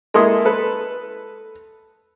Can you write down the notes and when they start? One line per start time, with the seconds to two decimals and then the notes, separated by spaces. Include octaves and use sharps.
0.14 G#3 A#3 E4 A4 C6 D#6
0.45 A4 B4